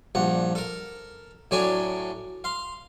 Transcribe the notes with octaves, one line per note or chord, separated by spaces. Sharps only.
A#1 G2 F#5
A4 A#4
A2 F#3 D4 D5 G#5
F5 C6